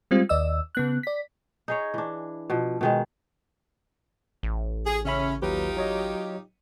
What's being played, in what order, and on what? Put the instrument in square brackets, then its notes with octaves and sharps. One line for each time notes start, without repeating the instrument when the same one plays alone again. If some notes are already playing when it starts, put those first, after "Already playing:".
[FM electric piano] G3 G#3 C4 F4
D#2 D5 D#5 E6
C#3 B3 F#6
D5 B6
[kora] D#4 G#4 C#5
E3 D4
B2 F3
B2 D#3 G#3
[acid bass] A1
[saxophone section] G#4
[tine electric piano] C#3 E5 B5 [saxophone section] C#4
[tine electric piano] D#2 F#3 B4 [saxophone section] D#4 F4 G4
[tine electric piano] F#3 C#5 D#5